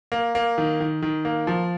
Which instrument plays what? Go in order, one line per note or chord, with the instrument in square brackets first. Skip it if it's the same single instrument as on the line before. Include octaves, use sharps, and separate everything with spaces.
[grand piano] A#3
A#3
D#3
D#3
D#3
A#3
F3